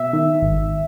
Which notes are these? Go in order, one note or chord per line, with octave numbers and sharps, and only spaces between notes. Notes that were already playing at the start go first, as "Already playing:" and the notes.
Already playing: B2 E5
D#3
G#1